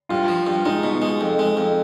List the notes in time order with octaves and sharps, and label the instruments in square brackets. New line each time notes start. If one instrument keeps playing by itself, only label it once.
[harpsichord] G2 [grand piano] F4
[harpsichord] F3
G2
[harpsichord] G#3 [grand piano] D#4
[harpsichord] B2
G#3
F2
G#3
F2